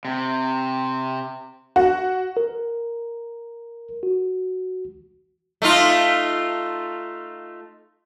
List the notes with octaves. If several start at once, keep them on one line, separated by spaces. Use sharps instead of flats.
C3
F#4
A#4
F#4
A3 D#4 F4